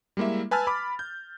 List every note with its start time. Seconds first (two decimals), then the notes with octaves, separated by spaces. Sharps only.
0.17 G3 G#3 A#3 E4 E5
0.51 B4 G#5 A5 E6 F6 A6
0.67 B5 D6
0.99 G6